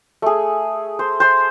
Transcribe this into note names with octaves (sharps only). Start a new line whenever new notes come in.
A3 G#4
C5
C5 C6